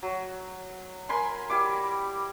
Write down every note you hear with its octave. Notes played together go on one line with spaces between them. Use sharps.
F#3
A#4 G#5 B5 C6
G3 E4 D6